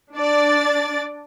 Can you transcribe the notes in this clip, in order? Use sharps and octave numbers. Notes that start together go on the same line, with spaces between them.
D4 D5 A6